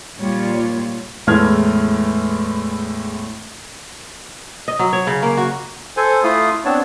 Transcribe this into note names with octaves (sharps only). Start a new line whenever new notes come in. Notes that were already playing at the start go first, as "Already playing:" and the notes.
D#2 A#2 F3 G3 F4 C#5
E2 A2 G#3 A3 F6 G#6
D#5
F#3
C#5
C#3
A#3
F#4
A4 C5 G#5
A3 E4 F4 F5 D#6
B3 C4 D4 C#5 A5